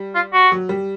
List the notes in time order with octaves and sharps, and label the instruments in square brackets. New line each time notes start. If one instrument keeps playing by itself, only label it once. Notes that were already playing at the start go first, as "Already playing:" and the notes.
Already playing: [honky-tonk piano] G3
[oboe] F4
F#4
[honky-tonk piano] F#3
G3